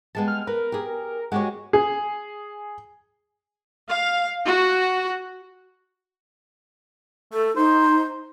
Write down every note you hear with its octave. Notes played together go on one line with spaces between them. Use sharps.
G3 G#3 B3 A5
F6
A#4 B4
G4 G#4
G#3 F#4 G4 C#5
G#4
F5
F#4
A3 A4
D#4 C5